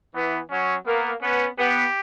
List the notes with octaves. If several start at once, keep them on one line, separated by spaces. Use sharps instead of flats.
E3 B3
F#3 C#4
A#3 B3
B3 C#4
B3 G4